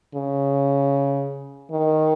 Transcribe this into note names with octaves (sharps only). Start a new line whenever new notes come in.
C#3
D#3